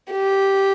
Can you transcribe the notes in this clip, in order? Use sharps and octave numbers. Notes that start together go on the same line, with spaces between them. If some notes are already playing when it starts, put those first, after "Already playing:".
G4